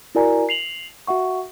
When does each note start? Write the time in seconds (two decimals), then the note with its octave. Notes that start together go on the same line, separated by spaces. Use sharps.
0.15 E4 F#4 A#4 D5 G#5 A#5
0.49 C7 F7 F#7
1.07 F#4 E5 F#5 C#6